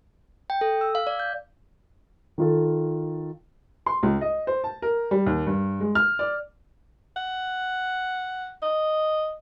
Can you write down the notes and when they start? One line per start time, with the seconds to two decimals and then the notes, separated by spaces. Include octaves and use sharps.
0.50 G5
0.61 A4
0.81 E6
0.95 F5
1.07 D5
1.20 G6
2.38 D#3 F4 A4
3.86 C6
4.03 C#2
4.21 D#5
4.47 C5
4.64 A5
4.82 A#4
5.11 G3
5.26 D#2
5.47 G2
5.80 G#3
5.95 F6
6.19 D5
7.16 F#5
8.62 D#5